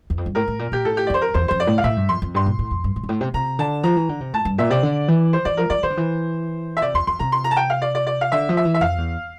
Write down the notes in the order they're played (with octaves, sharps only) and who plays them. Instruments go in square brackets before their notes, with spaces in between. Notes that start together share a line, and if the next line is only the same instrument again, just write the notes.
[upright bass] E2
F2
G2
[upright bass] A2 [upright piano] A#4
[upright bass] A2
A#2
[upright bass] A#2 [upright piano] G4
[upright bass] A2 [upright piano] A4
[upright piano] G4
D5
[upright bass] F2 [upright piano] C5
[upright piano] A#4
[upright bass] E2 [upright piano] C5
[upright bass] F2 [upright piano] C5
[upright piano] D5
[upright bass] A2
[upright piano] F5
[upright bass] A2 [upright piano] E5
[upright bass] G2
[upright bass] F2 [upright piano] C6
[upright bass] F2
[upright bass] G2 [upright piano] C6
[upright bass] A#2
A2
F2
G2
A2
G2
A2
C3
[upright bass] C3 [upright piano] A#5
[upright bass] D3 [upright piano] A5
[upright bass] F3 [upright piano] A#5
[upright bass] E3
D3
C3
[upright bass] A2 [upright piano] A5
[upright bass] G2
[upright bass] A#2 [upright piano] E5
[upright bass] C3 [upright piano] D5
[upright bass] D3
E3
[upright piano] C5
[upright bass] E3 [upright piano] D5
[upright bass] F3 [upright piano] A#4
[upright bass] F3 [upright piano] D5
[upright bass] E3 [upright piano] C5
[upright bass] D3
E3
[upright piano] E5
[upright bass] C3 [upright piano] D5
[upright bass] E2 [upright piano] C6
[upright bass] F2 [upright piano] C6
[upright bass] C3 [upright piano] A#5
[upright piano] C6
A#5
A5
G5
F5
D5
D5
D5
F5
[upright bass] D3 [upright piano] E5
[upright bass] F3
[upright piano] E5
[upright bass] E3
[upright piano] E5
[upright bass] F2 [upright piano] F5
[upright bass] E2